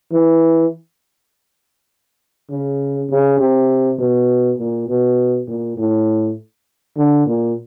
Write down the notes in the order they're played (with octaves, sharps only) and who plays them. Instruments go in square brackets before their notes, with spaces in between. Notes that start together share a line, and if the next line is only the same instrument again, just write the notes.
[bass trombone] E3
C#3
C#3
C3
B2
A#2
B2
A#2
A2
D3
A#2